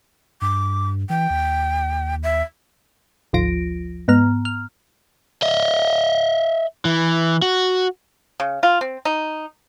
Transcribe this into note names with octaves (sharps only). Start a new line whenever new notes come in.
G2 D6
E3 G5
D#2
E5
G#1 D2 F3 F4 A#6 D7
G#2 B3 A#5 F6
F6
D#5 E5
E3
F#4
C#3
F4
C4
D#4